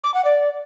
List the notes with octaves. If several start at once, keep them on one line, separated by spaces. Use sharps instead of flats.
D6
F#5
D5